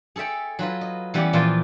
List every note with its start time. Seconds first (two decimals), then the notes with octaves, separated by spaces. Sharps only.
0.16 G#4 A4 C#5 E5 G5
0.59 F#3 F4 B4
0.81 D#5
1.14 E3 G3 B3 C#4 G4
1.33 A#2 E3 F3 F4 A5 C6